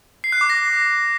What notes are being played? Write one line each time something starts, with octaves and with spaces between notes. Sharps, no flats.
C7
F#6
D6
A#6